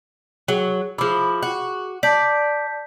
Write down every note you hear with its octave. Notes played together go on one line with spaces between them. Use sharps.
F#3 G#4
F3 E4 G#4 D6
F#4
D5 A5 G6 B6